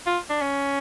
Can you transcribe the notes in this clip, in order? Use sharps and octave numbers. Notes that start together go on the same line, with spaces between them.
F4
D4
C#4